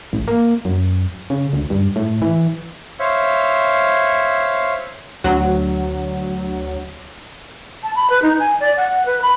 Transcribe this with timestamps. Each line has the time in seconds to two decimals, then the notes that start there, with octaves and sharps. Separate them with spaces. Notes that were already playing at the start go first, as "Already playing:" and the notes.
0.13 A1
0.28 A#3
0.65 F#2
1.30 C#3
1.53 D2
1.70 G2
1.96 A2
2.22 E3
2.99 C5 C#5 E5 F5
5.24 D2 F#3
7.83 A5
7.95 B5
8.10 B4
8.22 D#4
8.39 G#5
8.60 D5
8.77 F#5
8.89 F#5
9.05 B4
9.22 B5